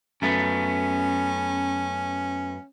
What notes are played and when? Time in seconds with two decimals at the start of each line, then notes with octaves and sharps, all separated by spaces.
0.22 F#2 A3 B3 C#4